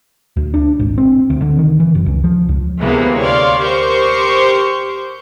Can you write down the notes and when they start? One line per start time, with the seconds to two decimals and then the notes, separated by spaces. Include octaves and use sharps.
0.37 D2
0.54 D4
0.80 G#1
0.98 C4
1.30 D2
1.42 D3
1.59 D#3
1.80 E3
1.95 F#1
2.06 C#2
2.24 F3
2.49 C#2
2.79 D2 C3 E3 G#3 A#3 B3
3.20 C#5 D5 F5 C6
3.61 G4 A#4 C5 C#6 G6